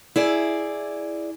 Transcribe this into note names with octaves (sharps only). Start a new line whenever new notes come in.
E4 G#4 D5